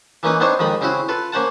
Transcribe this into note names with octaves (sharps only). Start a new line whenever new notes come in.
E3 A#3 C#4 D#4 B4
B3 C4 D4 D#4 C5 C#5
F2 D#3 G#3 D#5 B5
C#3 C4 C#4 E4 F#4
F4 A4 B4
A#3 C#4 C5 F#5 A5